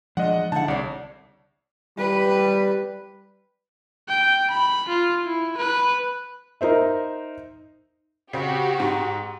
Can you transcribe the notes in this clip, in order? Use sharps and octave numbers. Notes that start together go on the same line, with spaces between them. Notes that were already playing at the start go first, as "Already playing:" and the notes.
F3 G#3 D4 D5 D#5 F#5
D3 D#4 E4 F#5 A5
C2 C#5 D5
G3 B4
G5
B5
F4
E4
B4
D#4 A#4 C5 E5
C#3 C4 F#4 G4
G#2